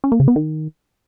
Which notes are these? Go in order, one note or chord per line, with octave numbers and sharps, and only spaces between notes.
C#4
A#3
C#3
B3
D#3